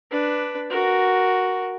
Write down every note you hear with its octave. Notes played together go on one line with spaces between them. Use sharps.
D4 B4
F#4 A#4